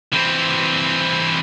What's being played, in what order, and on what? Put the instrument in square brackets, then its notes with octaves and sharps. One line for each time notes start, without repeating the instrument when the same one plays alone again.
[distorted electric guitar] E3 C4